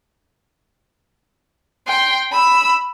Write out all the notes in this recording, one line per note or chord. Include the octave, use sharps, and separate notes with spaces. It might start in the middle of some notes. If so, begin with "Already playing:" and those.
G5 C6
B5 E6